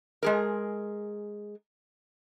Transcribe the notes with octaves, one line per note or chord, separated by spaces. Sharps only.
G#3 G#4 A#4